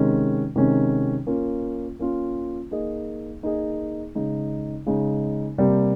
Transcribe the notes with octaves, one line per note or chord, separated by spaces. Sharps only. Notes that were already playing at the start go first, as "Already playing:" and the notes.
Already playing: C3 D#3 G#3 C#4
C3 D#3 G#3 C#4
A#3 C#4 F4
A#3 C#4 F4
A#3 D#4 G#4 D#5
A#3 D#4 G#4 D#5
C#3 G#3 D#4
C#3 G#3 D#4
C3 G3 A#3